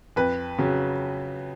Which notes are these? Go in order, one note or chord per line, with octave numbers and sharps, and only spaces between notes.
F2 B4
C#3 F#3